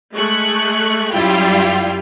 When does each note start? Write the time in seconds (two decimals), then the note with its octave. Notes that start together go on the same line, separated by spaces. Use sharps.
0.14 G#3 A3 C#6 F#6
1.13 F#2 G3 E4 F4 G5